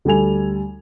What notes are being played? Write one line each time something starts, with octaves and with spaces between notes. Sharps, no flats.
D2 G3 A4 G#5 F7